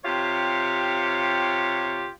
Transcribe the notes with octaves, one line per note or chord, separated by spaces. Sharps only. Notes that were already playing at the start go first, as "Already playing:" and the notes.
C3 F4 G4 C#5